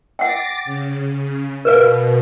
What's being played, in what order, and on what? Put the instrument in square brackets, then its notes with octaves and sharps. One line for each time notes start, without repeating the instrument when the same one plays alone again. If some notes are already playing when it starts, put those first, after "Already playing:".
[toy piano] F#5 G5 [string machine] D6 A6 A#6
[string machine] C#3
[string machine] B2 [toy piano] A#4 B4 F5